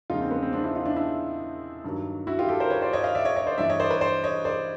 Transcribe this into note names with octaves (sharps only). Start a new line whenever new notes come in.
E2 C#3 F3 D#4 F4
C4
B3
C4
C4 D4
D4 E4
D#4 F4
D4 E4
D4 E4
G2 D#3 F#3
E4 F#4
F4 G4
G4 A4
A#4 C5
B4 C#5
C5 D5
C#5 D#5
D#5 F5
D5 E5
C#5 D#5
C#5 D#5
C5 D5
G2 E3 D5 E5
C#5 D#5
C5 D5
B4 C#5
C5 D5
C#5 D#5
C5 D5